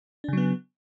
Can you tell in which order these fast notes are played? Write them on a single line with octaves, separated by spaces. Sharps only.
D4 C#3 F#3 B3